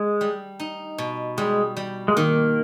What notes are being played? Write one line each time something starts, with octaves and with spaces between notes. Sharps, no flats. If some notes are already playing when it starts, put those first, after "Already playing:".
Already playing: G#3
G3
D#4
B2
G3 G#3
G3
G#3
D#3 A#3